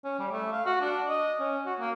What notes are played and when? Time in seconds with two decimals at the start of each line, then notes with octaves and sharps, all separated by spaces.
0.04 C#4
0.19 G3
0.31 A3
0.52 F5
0.66 F#4
0.81 D4
1.09 D#5
1.40 C#4
1.66 F#4
1.80 A#3